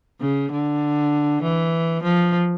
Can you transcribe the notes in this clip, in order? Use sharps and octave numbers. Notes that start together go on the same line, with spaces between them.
C#3
D3
E3
F3